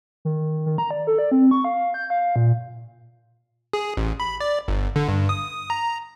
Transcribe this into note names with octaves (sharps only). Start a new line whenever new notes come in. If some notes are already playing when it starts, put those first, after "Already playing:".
D#3
D#3
A#5
D5
A4
D5
C4
C#6
F5
G6
F5
A#2
G#4
A1
B5
D5
G1
D3
G2
D#6
A#5